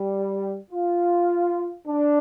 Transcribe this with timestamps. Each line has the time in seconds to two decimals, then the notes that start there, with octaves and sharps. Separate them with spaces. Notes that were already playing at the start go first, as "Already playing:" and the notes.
Already playing: G3
0.71 F4
1.87 D4